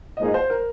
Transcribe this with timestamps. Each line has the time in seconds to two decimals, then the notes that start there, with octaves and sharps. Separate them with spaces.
0.17 G#2 F3 A#3 D#4 G#4 D#5
0.34 C5
0.50 A#4